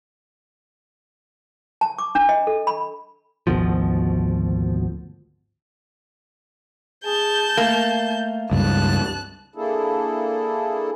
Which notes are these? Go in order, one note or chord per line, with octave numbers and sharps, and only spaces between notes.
A5
D6
D4
D#5
A4
B5
G#1 D2 B2 F3
G#4 A5 G6
A3 A#3
C#2 G2 A5 F#6
A#3 D4 E4 G#4 A4